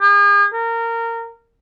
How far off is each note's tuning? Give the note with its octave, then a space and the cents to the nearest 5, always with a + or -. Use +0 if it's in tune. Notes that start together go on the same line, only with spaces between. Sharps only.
G#4 -45
A#4 -20